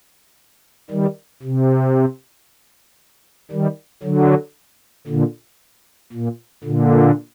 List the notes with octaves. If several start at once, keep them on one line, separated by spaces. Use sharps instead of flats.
D#3 G3
C3
D#3 G3
D3 F#3
A#2 D3
A#2
A#2 D3